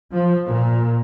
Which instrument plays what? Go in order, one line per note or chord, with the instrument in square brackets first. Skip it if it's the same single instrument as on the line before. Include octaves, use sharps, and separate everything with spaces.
[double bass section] F3
A#2